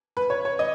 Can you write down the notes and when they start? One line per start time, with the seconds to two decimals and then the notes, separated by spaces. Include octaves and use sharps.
0.17 B4
0.30 C#5
0.45 C#5
0.59 D#5